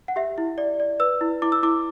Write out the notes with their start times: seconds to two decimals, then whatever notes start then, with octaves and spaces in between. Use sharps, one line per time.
0.08 F#5
0.16 G4 E5
0.38 E4
0.58 D5
0.80 D5
1.00 B4 E6
1.21 E4
1.42 E4 D6
1.52 E6
1.63 E4 D6